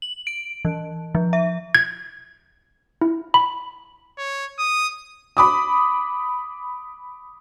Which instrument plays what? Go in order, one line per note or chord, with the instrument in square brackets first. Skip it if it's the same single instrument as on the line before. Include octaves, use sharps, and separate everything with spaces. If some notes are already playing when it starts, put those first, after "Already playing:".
[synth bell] F#7
D7
E3
F3
E5
[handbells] G#6
E4
B5
[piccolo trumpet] C#5
D#6
[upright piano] B5 D6 D#6